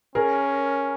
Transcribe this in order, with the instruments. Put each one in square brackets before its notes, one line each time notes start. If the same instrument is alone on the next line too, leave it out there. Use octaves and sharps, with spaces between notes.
[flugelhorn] C#4 [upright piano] G#4 A#4